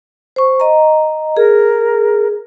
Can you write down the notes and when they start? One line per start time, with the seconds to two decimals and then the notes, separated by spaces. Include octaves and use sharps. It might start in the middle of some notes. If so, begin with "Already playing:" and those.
0.36 C5 C#6
0.60 D#5 A#5
1.37 G#4 A#4